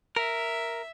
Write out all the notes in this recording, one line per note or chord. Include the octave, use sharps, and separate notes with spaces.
A#4 E5